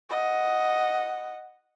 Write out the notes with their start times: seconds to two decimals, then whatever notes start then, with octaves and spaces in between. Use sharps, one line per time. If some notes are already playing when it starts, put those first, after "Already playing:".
0.10 D#5 F#5